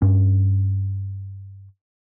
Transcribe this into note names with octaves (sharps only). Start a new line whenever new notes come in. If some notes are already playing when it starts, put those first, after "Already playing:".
G2 C#4